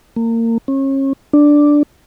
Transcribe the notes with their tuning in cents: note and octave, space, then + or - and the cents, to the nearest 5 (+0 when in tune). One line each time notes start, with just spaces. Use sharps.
A#3 -30
C#4 -35
D4 +0